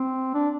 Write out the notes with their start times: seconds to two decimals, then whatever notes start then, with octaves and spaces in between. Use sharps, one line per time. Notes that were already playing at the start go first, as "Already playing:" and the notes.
Already playing: C4
0.34 D4